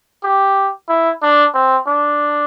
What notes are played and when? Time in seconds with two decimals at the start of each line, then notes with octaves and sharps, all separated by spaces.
0.24 G4
0.88 E4
1.22 D4
1.54 C4
1.87 D4